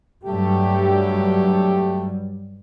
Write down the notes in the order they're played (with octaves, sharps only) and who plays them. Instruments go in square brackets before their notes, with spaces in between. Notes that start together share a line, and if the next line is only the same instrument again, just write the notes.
[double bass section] G2 F#3 G3 [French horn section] A3 G4